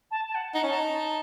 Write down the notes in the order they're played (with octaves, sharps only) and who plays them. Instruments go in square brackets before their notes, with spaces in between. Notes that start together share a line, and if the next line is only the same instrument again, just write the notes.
[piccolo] A5
A5
F#5
[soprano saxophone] D#4 [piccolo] F#5
[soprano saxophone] C#4
[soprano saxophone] D#4 [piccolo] A5
[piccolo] A#5
A5